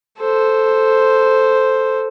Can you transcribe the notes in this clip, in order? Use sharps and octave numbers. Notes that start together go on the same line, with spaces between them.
A4 C5